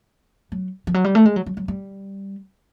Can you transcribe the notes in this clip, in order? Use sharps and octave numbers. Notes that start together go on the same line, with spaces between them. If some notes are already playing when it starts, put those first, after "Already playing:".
F#3
F3
F#3
G3
A3
G#3
F#3
F#3
F#3
G3